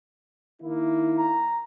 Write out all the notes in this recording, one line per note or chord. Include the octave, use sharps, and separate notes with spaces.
D#3 A#3 E4
A#5